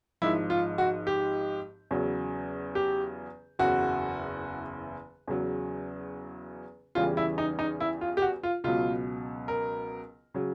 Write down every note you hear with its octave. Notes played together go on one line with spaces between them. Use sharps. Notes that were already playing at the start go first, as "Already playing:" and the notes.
G#1 G#2 F3 E4
F4
F#4
G4
E2 C#3 F#3
G4
F#1 E2 C#3 F#4
E2 C#3 F#3
E2 C#3 E3 G3 F4
E4
D#4
D#4
E4
F4
G4
F#4
F4
C#2 B2 F#3 F4
A#4
C#3 F#3